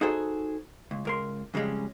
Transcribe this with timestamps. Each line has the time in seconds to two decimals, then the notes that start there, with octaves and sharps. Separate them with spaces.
0.01 D#4 F#4 G#4 A4 C5
0.91 C#2
1.05 C#2 A#4 C6
1.54 F2 C#3 G3 G#3 C#4